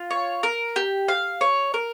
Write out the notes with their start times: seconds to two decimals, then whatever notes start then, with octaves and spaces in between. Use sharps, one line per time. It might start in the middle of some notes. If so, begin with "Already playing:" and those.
Already playing: F4
0.11 C#5
0.43 A#4
0.76 G4
1.08 F5
1.41 C#5
1.74 A#4